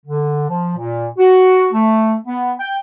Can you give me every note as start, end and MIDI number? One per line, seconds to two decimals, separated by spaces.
0.06 0.46 50
0.48 0.72 53
0.76 1.06 46
1.17 1.67 66
1.73 2.14 57
2.26 2.51 59
2.59 2.75 79